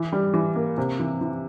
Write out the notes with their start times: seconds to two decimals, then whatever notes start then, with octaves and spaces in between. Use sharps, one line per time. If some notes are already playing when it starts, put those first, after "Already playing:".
Already playing: E3
0.12 G3
0.34 E3
0.56 A#3
0.78 C3
0.99 E3
1.21 E3